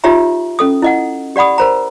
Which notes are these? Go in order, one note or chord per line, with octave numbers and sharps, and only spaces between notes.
D#4 F4 G4 C#5 E5 A#5
C#4 A4 D#6
E4 D#5 F#5
G4 D5 F#5 B5 D#6
A#4 C5 A#5